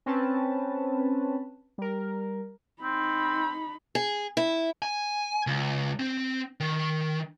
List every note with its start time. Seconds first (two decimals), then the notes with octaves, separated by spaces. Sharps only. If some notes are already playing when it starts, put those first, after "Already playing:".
0.06 C4 C#4 B4 A5
1.78 G3 A#4
2.82 C4 D#4 B5
3.95 G#4
4.37 E4
4.82 G#5
5.47 C#2
6.00 C4
6.60 D#3